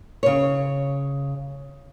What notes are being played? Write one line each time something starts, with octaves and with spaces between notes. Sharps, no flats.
C#3 C#5